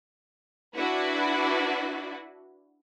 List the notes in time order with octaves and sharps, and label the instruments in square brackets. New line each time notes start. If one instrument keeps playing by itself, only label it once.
[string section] D4 E4 F#4 B4